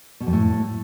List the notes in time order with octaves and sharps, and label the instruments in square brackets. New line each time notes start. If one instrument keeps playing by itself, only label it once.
[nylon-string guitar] B2
F2
A2